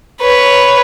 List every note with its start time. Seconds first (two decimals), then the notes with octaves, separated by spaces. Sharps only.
0.20 B4 C#5